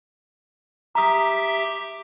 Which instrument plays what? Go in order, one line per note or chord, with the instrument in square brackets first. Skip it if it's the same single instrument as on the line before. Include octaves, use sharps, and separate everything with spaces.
[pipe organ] G4 E5 [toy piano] A#5 D#6